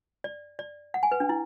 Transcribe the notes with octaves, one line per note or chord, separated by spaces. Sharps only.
D5
D5
F#5
G#5
B4
D4
E4